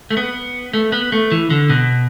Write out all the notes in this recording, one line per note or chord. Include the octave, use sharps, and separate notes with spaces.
A3
B3
A3
B3
A3
E3
D3
B2